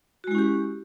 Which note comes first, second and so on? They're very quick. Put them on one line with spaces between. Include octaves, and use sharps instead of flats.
F#4 G#3 E4 C#4 G4